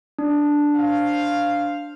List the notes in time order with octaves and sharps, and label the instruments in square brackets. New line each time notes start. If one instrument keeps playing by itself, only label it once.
[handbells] D4
[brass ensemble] C5 F5